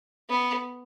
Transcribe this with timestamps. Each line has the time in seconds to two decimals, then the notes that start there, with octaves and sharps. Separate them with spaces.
0.29 B3